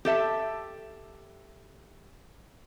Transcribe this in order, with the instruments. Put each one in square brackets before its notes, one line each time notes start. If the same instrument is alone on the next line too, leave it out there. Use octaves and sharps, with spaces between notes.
[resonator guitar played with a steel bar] G4 A4 E5